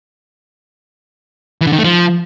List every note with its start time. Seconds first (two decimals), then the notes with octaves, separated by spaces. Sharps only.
1.61 E3
1.67 D3
1.73 D#3
1.78 A3
1.84 F3